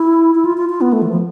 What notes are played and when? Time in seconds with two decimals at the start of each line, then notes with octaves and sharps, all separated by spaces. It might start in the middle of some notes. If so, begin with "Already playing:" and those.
Already playing: E4
0.35 E4
0.45 F4
0.57 F4
0.69 F4
0.81 B3
0.93 A3
1.02 E3
1.09 F3